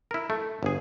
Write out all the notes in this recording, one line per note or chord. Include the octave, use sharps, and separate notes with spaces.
E4 A#4
A3
G1 G#4